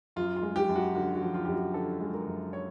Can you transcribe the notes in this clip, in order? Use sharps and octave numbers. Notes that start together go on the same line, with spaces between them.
F#2 F4
F4
G#3
G4
F#2
F#4
D3 F#4
F#4
F3
F4
F#2 G4
F#4
D3 A4
G#3
A#4
F#2
C#5